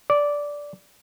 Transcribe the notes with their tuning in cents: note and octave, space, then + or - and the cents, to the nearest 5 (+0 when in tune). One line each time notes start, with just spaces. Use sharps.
D5 -10